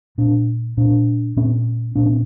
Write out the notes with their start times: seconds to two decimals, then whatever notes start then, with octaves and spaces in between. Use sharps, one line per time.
0.18 A#2 D4
0.77 A#2 D4
1.36 A#2 C#4
1.96 A#2 D4
2.06 C#4